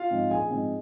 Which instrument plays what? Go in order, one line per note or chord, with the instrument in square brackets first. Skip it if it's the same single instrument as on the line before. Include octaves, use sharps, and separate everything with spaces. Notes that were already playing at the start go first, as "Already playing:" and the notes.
Already playing: [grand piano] F4 F5
G#2 F3 C4
A#1 G#4 G#5
G#2 F3 C4